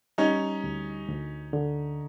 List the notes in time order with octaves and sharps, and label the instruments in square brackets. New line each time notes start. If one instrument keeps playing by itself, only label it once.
[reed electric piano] G3 [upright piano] C#4 D#4
[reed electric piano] D2
D2
D3